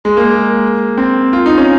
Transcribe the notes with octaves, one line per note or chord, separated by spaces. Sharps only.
G#3
A#3
C4
F4
D#4
C#4